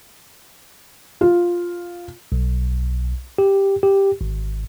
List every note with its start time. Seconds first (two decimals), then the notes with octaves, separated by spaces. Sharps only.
1.21 F4
2.32 B1
3.38 G4
3.83 G4
4.21 G#1